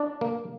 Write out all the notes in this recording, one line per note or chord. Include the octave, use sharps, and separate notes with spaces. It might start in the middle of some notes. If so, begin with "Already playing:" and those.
Already playing: D4 D5
A#3